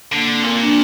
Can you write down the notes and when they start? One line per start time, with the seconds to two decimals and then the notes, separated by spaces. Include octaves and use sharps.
0.12 D3 A#3
0.28 C4
0.44 A#2 A#3
0.53 C4
0.61 D4